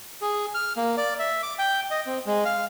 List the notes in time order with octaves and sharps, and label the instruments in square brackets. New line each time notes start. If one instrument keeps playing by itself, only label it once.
[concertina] G#4
F6
A#3
D5
E5
D6
G5
D#5
C4
G#3
F5